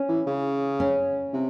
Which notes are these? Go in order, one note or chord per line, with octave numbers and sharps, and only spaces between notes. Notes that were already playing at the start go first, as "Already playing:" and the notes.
Already playing: C#4
E3
C#3
C#4
C3